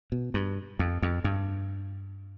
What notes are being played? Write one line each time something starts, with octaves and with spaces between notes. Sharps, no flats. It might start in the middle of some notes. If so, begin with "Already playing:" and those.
B2
G2
F2
F2
G2